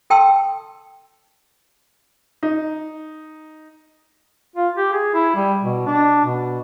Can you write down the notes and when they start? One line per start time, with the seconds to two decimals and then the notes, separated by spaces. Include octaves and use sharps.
0.10 A4 G5 A5 C6 E6
2.43 D#4
4.56 F4
4.77 G4
4.93 G#4
5.14 E4
5.36 G3
5.63 B2
5.86 D4
6.25 B2